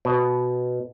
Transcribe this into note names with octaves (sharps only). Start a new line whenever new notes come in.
B2